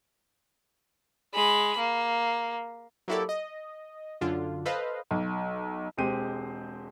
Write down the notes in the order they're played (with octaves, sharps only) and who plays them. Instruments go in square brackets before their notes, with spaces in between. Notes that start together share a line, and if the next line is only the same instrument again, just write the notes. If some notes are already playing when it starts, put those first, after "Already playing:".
[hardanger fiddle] G#3 B5
A#3
[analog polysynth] F#3 A#3 E4 G4 A4 D5
D#5
F#2 D3 D4 F4
A4 B4 C5 D#5 F5
[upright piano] B1
[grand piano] E1 G#3 C4 G4 C5 D#7